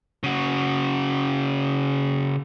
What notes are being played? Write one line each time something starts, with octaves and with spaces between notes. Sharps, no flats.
C#3 F#4